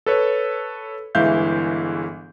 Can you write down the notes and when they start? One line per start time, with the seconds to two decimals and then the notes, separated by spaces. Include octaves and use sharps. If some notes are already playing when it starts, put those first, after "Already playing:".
0.06 A4 B4 C#5
1.15 G1 E3 G#3 E5 F5 G6